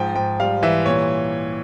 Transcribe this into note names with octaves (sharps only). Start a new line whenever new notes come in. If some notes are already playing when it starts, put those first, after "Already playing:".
Already playing: G#2 F3 G5
G#2 G5
G3 F5
E3 E5
A#2 C#5